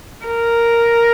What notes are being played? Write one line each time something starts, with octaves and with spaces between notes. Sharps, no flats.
A#4